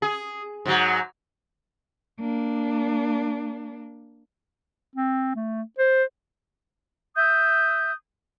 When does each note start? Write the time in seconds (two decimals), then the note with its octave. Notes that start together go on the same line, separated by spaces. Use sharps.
0.02 G#4
0.65 G#2 F#3
2.20 A#3 D4
4.96 C4
5.36 A3
5.79 C5
7.16 E5 D#6 G6